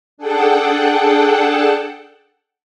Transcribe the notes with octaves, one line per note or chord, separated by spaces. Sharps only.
D4 G#4 A4 F#5 G5 A5